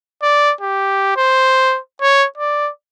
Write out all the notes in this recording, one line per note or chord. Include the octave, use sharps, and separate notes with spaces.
D5
G4
C5
C#5
D5